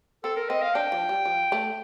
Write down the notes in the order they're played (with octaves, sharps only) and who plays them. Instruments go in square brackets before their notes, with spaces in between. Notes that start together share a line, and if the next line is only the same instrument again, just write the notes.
[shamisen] C4 [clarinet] A4
[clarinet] A#4
[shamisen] C4 [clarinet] D#5
[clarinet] F5
[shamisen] D4 [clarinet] G5
[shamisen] F3
G3
F3
A3